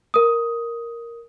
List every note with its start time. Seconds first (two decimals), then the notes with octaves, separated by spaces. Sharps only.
0.14 A#4 D#6